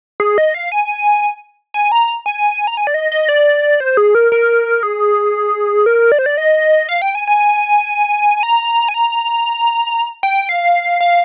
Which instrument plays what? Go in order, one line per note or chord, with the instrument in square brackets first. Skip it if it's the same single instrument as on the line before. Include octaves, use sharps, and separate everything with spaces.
[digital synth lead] G#4
D#5
F5
G#5
G#5
A#5
G#5
A#5
G#5
D5
D#5
D#5
D5
C5
G#4
A#4
A#4
G#4
A#4
D5
C5
D5
D#5
F5
G5
G#5
G#5
A#5
G#5
A#5
G5
F5
F5